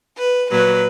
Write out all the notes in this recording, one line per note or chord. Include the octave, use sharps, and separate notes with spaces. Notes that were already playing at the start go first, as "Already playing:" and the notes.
B4
A#2 F#3 B4